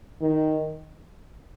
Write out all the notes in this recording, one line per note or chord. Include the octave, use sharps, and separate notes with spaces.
D#3